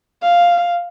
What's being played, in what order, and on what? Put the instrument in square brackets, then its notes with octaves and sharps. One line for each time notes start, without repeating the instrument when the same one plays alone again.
[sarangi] F5